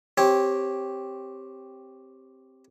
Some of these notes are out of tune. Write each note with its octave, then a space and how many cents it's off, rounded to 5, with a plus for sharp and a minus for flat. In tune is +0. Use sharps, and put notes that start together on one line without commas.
C4 +0 G4 +0 C#5 -15